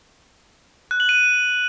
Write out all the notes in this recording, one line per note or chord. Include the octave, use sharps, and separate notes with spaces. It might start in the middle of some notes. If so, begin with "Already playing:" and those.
F#6
F#7
D#7